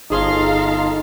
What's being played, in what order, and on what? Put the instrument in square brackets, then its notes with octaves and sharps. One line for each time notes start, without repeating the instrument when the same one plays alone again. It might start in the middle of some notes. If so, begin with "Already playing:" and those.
[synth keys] G1 G#4 C6 [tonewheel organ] D#4 [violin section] A4 F5 A#5